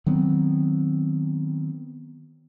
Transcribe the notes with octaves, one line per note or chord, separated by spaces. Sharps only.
D#3 F#3 B3 C4